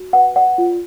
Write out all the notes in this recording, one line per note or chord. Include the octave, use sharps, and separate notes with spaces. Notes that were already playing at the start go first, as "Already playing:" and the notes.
Already playing: F#4
B4 F#5
D5 F#5
F4